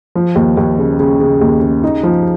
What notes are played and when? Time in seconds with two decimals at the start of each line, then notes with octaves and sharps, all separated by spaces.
0.15 F3
0.35 D#2
0.57 D#2
0.79 C#3
1.00 C#3
1.20 C#3
1.41 D#2
1.61 C#3
1.83 D#4
2.03 F3